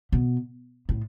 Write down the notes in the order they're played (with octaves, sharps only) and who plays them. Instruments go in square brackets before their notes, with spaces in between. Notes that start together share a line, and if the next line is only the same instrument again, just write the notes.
[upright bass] B2
A2